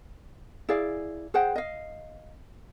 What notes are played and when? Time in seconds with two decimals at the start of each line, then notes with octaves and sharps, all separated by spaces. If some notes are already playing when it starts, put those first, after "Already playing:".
0.69 E4 G#4 D5 F5
1.34 G#4 C5 F#5 G5
1.56 D#5 F5